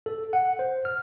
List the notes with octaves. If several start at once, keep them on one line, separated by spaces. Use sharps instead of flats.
A4
F#5
C5
F6